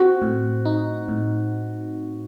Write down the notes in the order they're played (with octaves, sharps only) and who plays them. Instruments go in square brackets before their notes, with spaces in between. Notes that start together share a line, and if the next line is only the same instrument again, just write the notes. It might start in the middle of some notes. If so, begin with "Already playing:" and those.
Already playing: [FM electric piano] C4 [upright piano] F#4
[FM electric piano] A2
D#4
A2